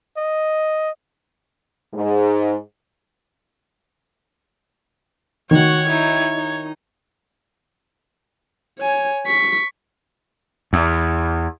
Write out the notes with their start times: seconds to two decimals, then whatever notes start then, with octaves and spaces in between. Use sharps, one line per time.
0.17 D#5
1.94 G#2
5.51 D#3 F#4 C#5 F#5 G#6
5.87 D#4 E4
6.36 D#4
8.80 C#5 G#5
9.27 C#6 B6
10.73 E2